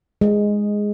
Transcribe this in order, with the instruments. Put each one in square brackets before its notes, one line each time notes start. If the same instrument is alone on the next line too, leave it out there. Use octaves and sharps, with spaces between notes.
[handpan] G#3